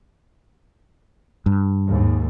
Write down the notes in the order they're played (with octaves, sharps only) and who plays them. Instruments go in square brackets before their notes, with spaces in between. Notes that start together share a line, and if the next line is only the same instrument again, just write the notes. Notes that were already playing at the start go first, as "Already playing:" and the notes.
[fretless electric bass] G2
[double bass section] D#2 G#2